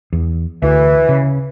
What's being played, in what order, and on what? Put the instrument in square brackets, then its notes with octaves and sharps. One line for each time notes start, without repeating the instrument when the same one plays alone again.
[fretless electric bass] E2
[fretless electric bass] D2 [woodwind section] E3
[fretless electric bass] C#3